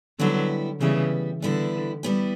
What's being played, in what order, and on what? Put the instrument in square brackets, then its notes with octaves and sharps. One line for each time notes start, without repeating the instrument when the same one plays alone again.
[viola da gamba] D3 F#3 [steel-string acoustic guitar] G3 B3 E4 G4
[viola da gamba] C#3 E3 [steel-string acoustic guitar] G3 B3 E4 G4
[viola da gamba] D3 [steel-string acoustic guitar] G3 B3 E4 G4
[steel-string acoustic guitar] G3 B3 E4 G4